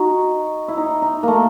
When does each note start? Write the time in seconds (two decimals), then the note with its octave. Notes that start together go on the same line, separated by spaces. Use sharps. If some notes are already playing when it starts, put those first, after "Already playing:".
Already playing: D#4 F#4
0.68 E4
0.77 D#4
1.02 D#4
1.23 A3 A#3